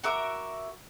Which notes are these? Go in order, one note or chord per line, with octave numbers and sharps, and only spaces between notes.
F#4 A#4 E5 D6